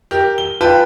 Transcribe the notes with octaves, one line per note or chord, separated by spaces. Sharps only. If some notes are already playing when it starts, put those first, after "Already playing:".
G4 A#4
G7
F4 B4 G5 A5 B5